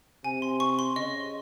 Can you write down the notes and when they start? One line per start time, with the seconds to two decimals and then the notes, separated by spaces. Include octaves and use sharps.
0.24 C3 G#5
0.42 C6
0.60 C#6
0.79 C6
0.96 C#3 D#5